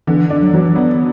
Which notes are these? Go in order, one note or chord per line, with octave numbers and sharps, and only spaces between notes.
D3 E3
D4
F#3
E3 F#3
B3